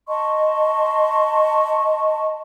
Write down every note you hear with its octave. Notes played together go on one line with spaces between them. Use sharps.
D#5 A5 C6 C#6